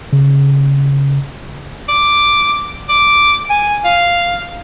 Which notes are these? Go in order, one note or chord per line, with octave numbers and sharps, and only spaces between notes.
C#3
D6
D6
G#5
F5